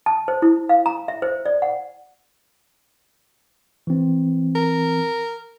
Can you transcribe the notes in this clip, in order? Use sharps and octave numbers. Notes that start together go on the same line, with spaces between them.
A5
C5
E4
F5
A#5
E5
C5
D5
F#5
E3 C4
A#4